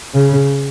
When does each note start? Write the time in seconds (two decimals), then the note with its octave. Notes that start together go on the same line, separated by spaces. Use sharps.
0.14 C#3